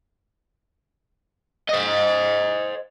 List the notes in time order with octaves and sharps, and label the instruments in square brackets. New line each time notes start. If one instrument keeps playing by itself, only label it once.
[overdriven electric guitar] C5 D#5